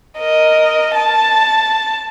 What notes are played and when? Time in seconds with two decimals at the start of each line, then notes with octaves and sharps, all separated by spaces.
0.18 A#4 D#5
0.94 A5